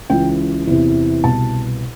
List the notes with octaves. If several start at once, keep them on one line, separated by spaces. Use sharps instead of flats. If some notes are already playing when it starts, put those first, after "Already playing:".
C#2 C#3 E3 G5
E2 C3 E3
C2 B2 A5